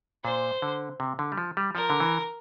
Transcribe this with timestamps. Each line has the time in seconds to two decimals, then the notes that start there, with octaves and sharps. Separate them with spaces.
0.24 A#2 C5
0.62 D3
1.00 C3
1.19 D3
1.32 G3
1.38 F3
1.57 G3
1.75 F3 A#4
1.90 D3
2.00 E3